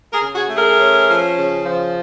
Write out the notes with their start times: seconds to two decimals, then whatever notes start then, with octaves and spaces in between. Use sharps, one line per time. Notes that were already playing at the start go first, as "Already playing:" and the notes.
0.13 G#4 A#4
0.20 C#3
0.34 F#4 G#4
0.49 A3
0.56 G#4 A#4
0.79 C#4
1.07 F3
1.36 C#3
1.65 F3